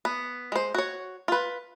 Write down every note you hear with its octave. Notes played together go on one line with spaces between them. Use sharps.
B3
G#3 C5
F#4 C#5
F4 B4